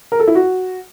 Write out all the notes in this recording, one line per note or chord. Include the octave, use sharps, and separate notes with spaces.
A#4
A4
E4
F#4